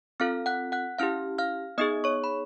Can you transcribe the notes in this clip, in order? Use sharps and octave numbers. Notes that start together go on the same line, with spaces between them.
C4 F4 A4 F5 F6
F#5 F#6
F#5 F#6
C#4 E4 G4 F5 F6
F5 F6
B3 D#4 G#4 D#5 D#6
C#5 C#6
B5